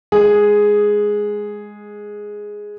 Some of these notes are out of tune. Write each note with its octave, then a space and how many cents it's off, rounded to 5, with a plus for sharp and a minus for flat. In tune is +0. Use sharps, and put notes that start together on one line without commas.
G#3 +0 G#4 +0